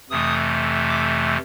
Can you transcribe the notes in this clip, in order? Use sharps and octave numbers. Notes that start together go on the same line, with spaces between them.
F2 C3 E3 A3 D#6
D6